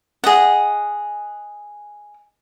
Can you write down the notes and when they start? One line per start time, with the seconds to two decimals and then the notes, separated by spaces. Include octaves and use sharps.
0.24 G#4 D#5 F#5